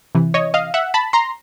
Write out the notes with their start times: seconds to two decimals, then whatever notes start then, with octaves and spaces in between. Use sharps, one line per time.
0.15 C3 E3
0.34 C#5 D#5
0.54 D#5 F5
0.74 E5 F#5
0.94 A5 B5
1.13 A#5 C6